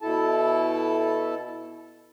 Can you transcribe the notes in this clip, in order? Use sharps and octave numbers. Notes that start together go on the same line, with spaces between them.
B2 E4 A4 A5